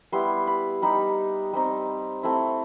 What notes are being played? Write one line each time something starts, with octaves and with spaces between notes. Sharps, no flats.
G3 B3 E4 C6
B5
G3 D#4 B5
G3 C4 D#4
A3 C4 E4